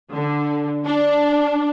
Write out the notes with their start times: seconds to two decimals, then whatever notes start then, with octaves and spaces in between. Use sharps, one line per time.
0.13 D3
0.85 D4